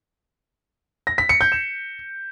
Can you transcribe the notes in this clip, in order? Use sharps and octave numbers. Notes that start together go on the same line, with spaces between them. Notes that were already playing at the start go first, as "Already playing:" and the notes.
A#6
B6
C#7
G6
E7